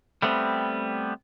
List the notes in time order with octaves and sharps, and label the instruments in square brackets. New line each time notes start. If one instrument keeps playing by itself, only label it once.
[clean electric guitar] G3 A3 B3 C4